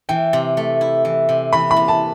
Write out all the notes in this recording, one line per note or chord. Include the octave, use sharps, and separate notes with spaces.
E3 G5
C3
A3
E4
E3
C3
E3 B5
B5
C3
A5